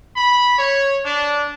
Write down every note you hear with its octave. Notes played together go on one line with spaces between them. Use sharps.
B5
C#5
D4